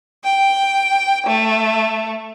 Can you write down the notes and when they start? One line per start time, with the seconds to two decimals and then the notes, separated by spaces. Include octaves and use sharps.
0.24 G5
1.26 A3